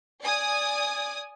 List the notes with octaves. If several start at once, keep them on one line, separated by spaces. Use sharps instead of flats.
D5 G#5 D#6